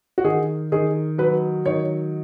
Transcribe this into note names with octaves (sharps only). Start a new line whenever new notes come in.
F#4
D#3 G#4
D#3 G#4
F#3 B4
D#3 C#5